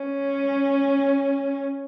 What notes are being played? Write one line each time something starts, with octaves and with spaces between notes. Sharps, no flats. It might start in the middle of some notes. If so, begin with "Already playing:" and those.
Already playing: C#4